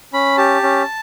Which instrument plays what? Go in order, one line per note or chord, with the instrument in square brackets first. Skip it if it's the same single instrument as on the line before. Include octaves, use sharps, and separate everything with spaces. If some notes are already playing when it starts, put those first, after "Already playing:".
[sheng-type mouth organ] C#4 B5
G4 A5
C#4